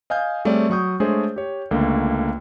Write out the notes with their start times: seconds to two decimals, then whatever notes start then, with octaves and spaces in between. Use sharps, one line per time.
0.10 D#5 F5 G#5 F6 G6
0.45 G3 A3 C4 G#4 C#5 D5
0.70 F#3 C#6 D#6 G6
1.00 G#3 A3 D4 G#4 C5 C#5
1.36 G4 C#5
1.71 C#2 D3 A3 A#3